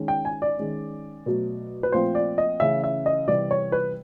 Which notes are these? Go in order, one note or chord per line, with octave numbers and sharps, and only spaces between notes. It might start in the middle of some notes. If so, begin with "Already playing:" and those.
Already playing: D#3 G#3 C#4
G5
G#5
D5
D#3 G#3 C#4
B2 F#3 A3
B4
A#2 F3 A3 C4 C5
D5
D#5
C#3 E3 A3 C#4 E5
E5
D#5
C3 E3 G3 B3 D5
C#5
B4